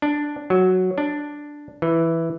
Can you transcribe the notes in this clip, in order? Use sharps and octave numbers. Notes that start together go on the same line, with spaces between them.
D4
F#3
D4
E3